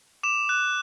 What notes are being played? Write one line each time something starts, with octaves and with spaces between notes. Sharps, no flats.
D6 E7
F#6